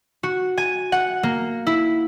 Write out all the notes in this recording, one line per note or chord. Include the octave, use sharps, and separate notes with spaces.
F#4
G#5
F#5
A#3
E4